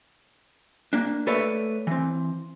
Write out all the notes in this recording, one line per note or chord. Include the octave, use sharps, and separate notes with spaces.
A#3 D4
A3 A4 B4 C#5 D5 E5
E3 C4